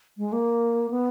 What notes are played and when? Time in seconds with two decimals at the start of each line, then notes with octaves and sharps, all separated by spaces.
0.18 G#3
0.33 A#3
0.90 B3